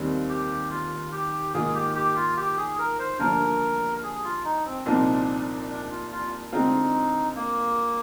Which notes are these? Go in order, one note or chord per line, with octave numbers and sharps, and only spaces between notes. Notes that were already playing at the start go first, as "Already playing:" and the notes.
Already playing: D#2 D#3 G3 C4
G4
F4
G4
G#2 D#3 A#3 F4 G#4
G4
G4
F4
G4
G#4
A#4
C5
G2 D3 F3 A#3 A#4
G#4
F4
D#4
C4
C2 A#2 F3 C4 D4 D#4
D4
F4
F4
D3 G#3 C4 D#4 F4
A#3